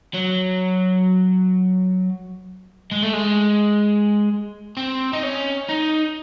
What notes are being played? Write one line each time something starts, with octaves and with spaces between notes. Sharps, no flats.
F#3
G#3
A3
G#3
C4
D#4
C#4
D#4